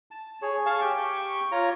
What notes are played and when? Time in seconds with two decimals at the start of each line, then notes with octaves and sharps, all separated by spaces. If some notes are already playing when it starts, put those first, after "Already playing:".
0.11 A5
0.42 G#4 C#5
0.66 G#4 F5 A5 C#6
0.81 G4 G5 C#6
1.52 F4 C#5 A#5